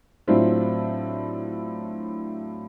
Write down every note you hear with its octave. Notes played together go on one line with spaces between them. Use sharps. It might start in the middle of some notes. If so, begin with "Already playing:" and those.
A2 F#3 C4 D4 E4 F4